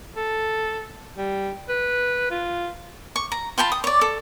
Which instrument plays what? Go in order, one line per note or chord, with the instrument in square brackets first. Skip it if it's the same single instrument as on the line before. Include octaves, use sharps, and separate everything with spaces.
[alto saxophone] A4
G3
B4
F4
[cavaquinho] C#6
A#5
F4 G5 A5 B5
D#6
C#5 D5
A4